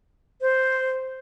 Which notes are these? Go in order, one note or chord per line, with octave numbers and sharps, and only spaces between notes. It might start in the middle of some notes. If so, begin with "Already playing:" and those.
C5